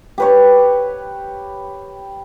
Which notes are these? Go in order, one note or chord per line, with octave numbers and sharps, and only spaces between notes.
G4 B4 C#5